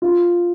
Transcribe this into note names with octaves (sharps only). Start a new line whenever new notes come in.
F4